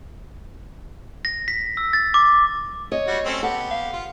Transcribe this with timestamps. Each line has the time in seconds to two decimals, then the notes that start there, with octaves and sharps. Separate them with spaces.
1.25 A#6
1.48 B6
1.77 E6
1.93 A6
2.14 D6
2.92 C#5 D#5
3.07 G3 F#4
3.25 A3 C4 C#4
3.43 B3 G4 A4 F#5
3.71 F5
3.93 F4